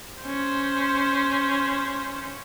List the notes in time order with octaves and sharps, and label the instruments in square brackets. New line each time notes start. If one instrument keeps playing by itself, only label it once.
[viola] C#4 C5